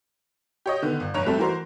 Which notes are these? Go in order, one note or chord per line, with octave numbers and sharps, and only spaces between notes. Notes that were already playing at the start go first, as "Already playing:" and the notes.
G4 C#5 D#5
D3 D#3 B3
G1
F1 G2 C#5 A#5 F7
G3 A3 C4 A4
E3 F#4 A#4 C5